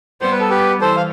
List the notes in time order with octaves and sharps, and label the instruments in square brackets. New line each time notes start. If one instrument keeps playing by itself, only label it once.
[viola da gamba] G3 B3 [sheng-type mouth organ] C5
[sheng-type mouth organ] B4
A4
G4 B4
[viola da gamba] E3 G3 [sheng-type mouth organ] A4 C5
[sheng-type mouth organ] F5